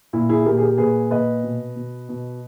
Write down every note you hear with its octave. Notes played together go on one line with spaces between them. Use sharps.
A#2 E4
E4 G#4
A#2 G4 A#4
G#4
G4 A#4
A#2 G#4 B4
A#2 B4 D#5
B2
B2
B2